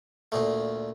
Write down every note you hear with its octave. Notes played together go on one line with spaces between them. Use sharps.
D2 A#2 A3